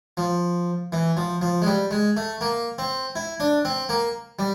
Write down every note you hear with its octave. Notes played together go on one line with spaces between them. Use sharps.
F3
E3
F3
F3
G#3
G3
G#3
A3
A#3
C4
E4
D4
C4
A#3
G3